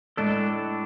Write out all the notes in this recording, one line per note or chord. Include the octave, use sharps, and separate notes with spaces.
A2 G#3 D4 A4